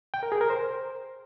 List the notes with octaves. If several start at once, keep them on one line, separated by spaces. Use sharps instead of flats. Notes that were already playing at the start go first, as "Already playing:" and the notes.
G5
A#4
G#4
A#4
C5